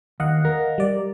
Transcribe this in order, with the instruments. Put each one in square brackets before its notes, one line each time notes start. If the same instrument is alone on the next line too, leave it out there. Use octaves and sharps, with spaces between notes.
[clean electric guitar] D#2 [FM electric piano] D#5 F5 F#5
[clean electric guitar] A#4
[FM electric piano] G3 D5